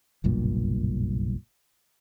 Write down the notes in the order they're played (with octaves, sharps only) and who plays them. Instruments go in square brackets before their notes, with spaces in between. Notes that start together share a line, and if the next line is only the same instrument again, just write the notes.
[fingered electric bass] F#1 B1 G2 A#2